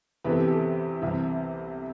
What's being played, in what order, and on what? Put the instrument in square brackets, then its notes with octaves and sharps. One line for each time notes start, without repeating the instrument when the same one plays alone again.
[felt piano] E2 C3 E3 B4
A4
G4
A4
C2 C3 E3